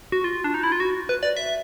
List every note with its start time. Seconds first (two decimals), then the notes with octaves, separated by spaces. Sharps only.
0.12 F#4
0.24 F4
0.44 D4
0.54 D#4
0.63 E4
0.72 F4
0.80 F#4
1.09 B4
1.23 D5
1.37 E5